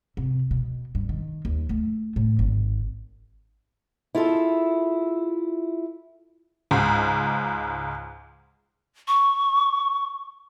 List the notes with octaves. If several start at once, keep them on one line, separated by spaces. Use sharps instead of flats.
C3
B2
G2
D#3
D#2
A3
A2
G#1
E4 F4 G#4 A4
C#2 G#2
C#6